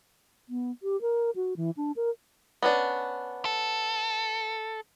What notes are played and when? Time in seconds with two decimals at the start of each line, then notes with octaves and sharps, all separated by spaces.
0.49 B3
0.83 G4
1.01 A#4
1.36 F#4
1.57 E3
1.77 D4
1.96 A#4
2.63 B3 C#4 D4
3.45 A4